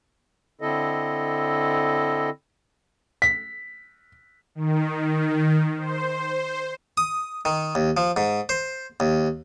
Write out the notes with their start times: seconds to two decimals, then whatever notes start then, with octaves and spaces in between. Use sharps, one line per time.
0.61 D3 C4 E4 A4 D#5
3.22 B6
4.55 D#3
5.77 C5
6.97 D#6
7.45 D#3
7.75 D#2
7.97 F3
8.17 G#2
8.49 C5
9.00 D#2